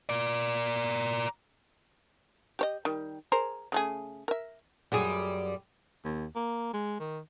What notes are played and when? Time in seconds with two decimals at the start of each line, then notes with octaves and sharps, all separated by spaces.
0.09 A#4 D5
2.59 G4 C#5 D#5
2.85 D#3 G3
3.32 G#4 A#4 C5
3.72 C#3 A3 G#4
4.28 A#4 E5
4.92 F#2 G3 G#4
6.05 D#2
6.36 A#3
6.74 G#3
7.00 D#3